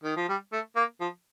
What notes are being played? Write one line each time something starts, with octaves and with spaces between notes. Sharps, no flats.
D#3
F3
G3
A3
A#3
F3